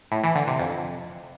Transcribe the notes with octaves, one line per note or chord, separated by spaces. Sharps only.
A2
E3
D3
C3
F2